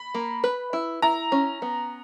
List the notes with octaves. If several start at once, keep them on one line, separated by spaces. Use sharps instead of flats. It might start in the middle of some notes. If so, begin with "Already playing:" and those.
Already playing: B5
A#3
B4
E4
E4 A#5
C#4
B3